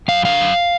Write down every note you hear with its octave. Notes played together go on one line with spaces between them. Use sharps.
F#2 F5
D3 F5
F#2